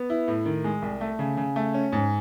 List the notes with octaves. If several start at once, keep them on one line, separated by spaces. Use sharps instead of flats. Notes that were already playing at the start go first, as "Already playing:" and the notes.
Already playing: B3
E4
A2
D#3
G#3
C2
A3
C#3
C#3
A3
C#4
G#2